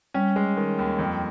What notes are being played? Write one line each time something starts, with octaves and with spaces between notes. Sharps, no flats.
G3 C#4
G#3
D#3
D#2
F2